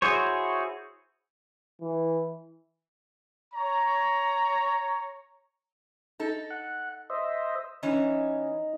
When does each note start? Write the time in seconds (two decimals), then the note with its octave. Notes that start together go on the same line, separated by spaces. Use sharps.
0.02 E4 F#4 G#4 C5 C#5
1.81 E3
3.54 C#5 A#5
6.19 D#4 A4
6.51 F#5
7.10 C5 D#5 E5
7.83 E3 C#4 D#4